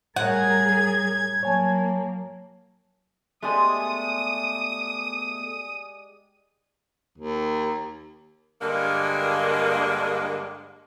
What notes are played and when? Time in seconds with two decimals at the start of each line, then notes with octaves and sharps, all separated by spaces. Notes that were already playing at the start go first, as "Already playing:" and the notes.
0.16 A2 G3 G#4 A#4 C#5 F#5 G#6
1.43 F#3 A#3 C#5 G#5 A5
3.43 G#3 A3 B3 G4 D5 G#5 D#6
7.18 D#2
8.61 G2 D3 G#3 A#3